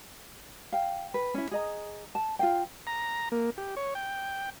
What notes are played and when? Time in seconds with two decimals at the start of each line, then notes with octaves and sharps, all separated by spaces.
0.72 F5 G5
1.14 B4
1.34 C#4 E4
1.51 G#4 D#5 A#5
2.15 A5
2.39 F4 F5 G5
2.87 A#5
3.32 A#3
3.58 G4
3.77 C#5
3.95 G5